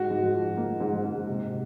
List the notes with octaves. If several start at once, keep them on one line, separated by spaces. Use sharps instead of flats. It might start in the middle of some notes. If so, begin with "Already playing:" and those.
Already playing: G#2 F#4
G#2
F3
A#3
G#2
G#2
C3